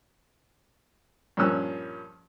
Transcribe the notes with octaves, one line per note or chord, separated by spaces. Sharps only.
G2 A#2 F3 C#4 E6 F#6